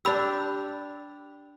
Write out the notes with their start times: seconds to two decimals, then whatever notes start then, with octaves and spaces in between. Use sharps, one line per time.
0.05 D4 G4 B5 E6